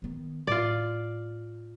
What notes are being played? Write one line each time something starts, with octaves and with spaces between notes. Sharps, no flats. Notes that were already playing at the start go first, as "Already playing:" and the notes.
D#3 B3
A2 F4 D5